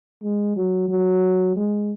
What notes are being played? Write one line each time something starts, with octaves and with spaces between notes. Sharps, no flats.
G#3
F#3
F#3
G#3